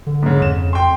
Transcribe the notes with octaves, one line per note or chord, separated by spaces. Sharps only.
D3
G#2 C#3
F2 E7
G5 C6